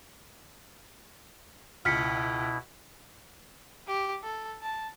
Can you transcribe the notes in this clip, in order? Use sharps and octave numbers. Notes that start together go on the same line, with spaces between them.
C#2 B2 E4 F6 B6 C#7
G4
A4
A5